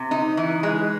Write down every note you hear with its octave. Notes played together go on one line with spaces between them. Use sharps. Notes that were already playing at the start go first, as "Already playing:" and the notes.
Already playing: C3
D#4
E3
G#3